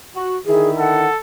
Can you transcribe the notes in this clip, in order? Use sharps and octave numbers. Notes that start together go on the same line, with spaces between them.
F#4
D3 D#3 E4 G#4
A4 F#5